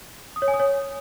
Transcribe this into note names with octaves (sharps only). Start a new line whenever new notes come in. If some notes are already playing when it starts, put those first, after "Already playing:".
D#6
C#5
G#5
D#6
C#5